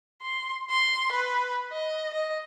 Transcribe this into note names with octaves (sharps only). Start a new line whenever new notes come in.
C6
C6
B4
D#5
D#5